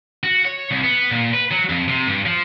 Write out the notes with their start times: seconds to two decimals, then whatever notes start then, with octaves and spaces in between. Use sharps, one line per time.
0.23 F#4
0.45 C#5
0.71 C2
0.83 B3
1.11 A#2
1.34 B4
1.51 F#3
1.69 F2
1.88 C3
2.07 G2
2.26 F3